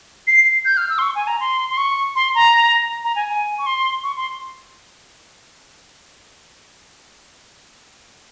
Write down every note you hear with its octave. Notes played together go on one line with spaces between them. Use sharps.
C7
G6
F6
E6
C6
C#6
G#5
A#5
C6
C6
C#6
C6
A#5
A#5
G#5
G#5
C#6
C6
C#6
C6